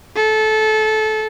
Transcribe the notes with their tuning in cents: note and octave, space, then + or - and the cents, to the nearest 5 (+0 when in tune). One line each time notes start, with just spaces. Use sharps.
A4 -20